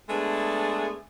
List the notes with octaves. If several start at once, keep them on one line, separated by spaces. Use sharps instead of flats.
G#3 A3 B3 D4 G#4